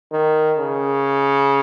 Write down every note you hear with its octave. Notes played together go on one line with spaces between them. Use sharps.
D#3
C#3